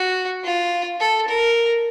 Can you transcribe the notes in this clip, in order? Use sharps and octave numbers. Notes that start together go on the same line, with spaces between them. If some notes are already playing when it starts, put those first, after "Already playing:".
Already playing: F#4
F4
A4
A#4